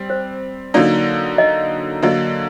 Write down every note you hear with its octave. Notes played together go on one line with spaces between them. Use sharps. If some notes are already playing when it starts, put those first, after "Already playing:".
Already playing: G3 C4
C5
D3 F#3 A#3 D#4 D5
D#5
D3 F#3 A#3 D#5